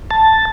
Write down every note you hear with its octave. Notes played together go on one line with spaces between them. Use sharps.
A5